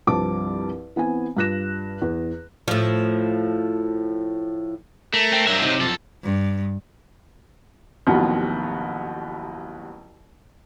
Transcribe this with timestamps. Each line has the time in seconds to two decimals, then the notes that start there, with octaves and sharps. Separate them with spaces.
0.07 C2 G2 F3 C4 A5 D6
0.96 E3 B3 C4 G#5
1.37 G2 F4 F#6 A#6 E7
2.02 E2
2.68 A2 F3
5.14 A3 A#4
5.33 C4
5.47 G2 F#3 C5 E5
5.63 C3 D#4
5.81 F#2 F3 A4
6.24 G2
8.07 A1 D#2 C3 F3 F#3 B3